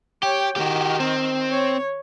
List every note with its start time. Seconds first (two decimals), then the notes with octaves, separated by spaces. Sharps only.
0.23 G4 C#5 G5
0.56 D#3 F#4 G4
1.00 C4
1.49 C#5